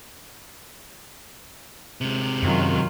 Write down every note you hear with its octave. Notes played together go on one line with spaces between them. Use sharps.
C3 G#3
F#2 D#3 F#3 F4